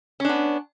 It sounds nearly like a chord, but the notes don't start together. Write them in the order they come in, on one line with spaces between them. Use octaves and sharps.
C#4 D4 B3